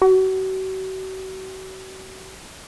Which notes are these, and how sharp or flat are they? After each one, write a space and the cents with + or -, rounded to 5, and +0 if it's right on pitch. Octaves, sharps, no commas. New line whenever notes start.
F#4 +40